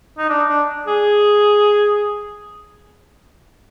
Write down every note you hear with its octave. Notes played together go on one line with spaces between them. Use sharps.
D#4
D4
D4
G#4